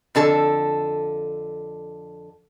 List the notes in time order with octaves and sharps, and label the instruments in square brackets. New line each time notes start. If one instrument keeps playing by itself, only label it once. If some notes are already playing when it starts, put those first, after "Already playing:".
[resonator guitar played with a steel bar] F2 D3 A4 A5